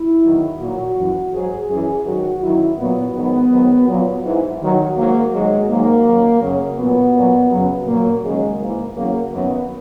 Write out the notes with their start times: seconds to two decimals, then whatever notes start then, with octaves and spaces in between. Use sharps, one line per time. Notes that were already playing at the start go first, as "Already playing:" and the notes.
Already playing: E4
0.24 E2 D#3 F#3
0.60 A#2 F#3 F#4
0.97 F#2 E3
1.33 G#2 F#3 G#4
1.70 F#2 E3 G#4
2.06 G#2 D#3 F#3 F#4
2.42 F#2 D#3 F#3 E4
2.78 A#2 F#3 B3
3.15 G#2 D#3 F#3 B3
3.51 G#2 D#3 F#3
3.88 A#2 F#3
4.24 G#2 E3
4.60 D#2 D#3 F#3
4.97 G#2 F#3 A#3
5.33 G#2 D#3 F#3 G#3
5.69 G#2 D#3 F#3 A#3
6.06 F#2 D#3 F#3
6.42 F#2 C#3 F#3
6.78 A#2 F#3 B3
7.15 A#2 F#3
7.51 F#2 C#3 F#3
7.87 A#2 F#3 A#3
8.23 D#2 C#3 F#3 G#3
8.59 G#2 E3 A#3
8.96 E2 C#3 F#3 A#3
9.33 F#2 D#3 F#3 B3